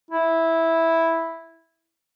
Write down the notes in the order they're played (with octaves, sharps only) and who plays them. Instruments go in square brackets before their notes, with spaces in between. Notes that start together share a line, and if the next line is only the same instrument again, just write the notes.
[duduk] E4